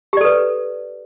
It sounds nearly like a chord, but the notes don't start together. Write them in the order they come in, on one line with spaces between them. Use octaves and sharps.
G4 D5 A4 B4